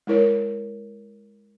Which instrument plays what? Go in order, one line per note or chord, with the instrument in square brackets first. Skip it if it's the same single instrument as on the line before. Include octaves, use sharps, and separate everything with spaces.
[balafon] G#3 E4 A#4 C#5